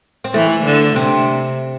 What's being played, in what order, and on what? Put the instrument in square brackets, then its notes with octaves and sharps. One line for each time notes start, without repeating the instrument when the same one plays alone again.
[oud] C4
[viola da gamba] E3 [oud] A3
[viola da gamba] D3
[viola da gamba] C3 [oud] C4